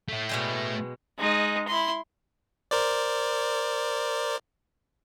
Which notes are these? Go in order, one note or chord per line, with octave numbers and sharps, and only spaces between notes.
A3 E4
B2 G#3 G5
G#3 D#4
E4 C6
A#4 C5 D5